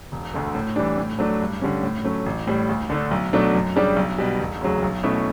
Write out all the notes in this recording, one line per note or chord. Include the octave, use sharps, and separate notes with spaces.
E1
D2 D3 A3
A2
E3 G3 D4
A2
F#3 A3 D4
G2
D3 G3 C#4
A2
F#3 A3 C#4
A1
A2 G3
D2
D3 A3 D4
B1
B2 F#3 A3 D4
F#2
C#3 G3 D4 G4
B1
B2 G3
E1
D2 C#3 F#3
B1
B2 A3 C#4 E4